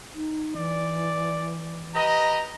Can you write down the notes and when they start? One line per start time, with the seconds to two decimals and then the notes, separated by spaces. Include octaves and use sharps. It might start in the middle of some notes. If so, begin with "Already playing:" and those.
0.15 D#4
0.56 E3 D5
1.95 G4 B4 D#5 A#5